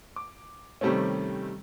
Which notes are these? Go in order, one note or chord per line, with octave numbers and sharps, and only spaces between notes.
D6
C3 D#3 G3 A3 C4 C#4